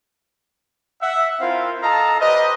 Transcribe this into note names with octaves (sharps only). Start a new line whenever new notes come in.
E5 F#5
C4 E4 F4 A#4 C5 F5
A4 D#5 F5 A5 A#5
G4 B4 C5 D5 D#5